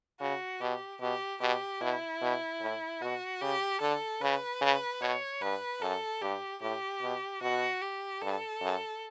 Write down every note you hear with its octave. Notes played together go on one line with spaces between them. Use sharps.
C#3 F#4
B2 G4
B2 G4
B2 G4
B2 E4
B2
A2
B2 F#4
C#3 G4
D3 A4
C#3 B4
C#3
B2 C#5
G2 B4
F#2 A4
G2 G4
A2 G4
B2
B2 F#4
G4
G2 A4
F#2